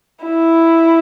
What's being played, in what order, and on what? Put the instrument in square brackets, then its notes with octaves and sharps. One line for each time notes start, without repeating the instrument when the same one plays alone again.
[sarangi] E4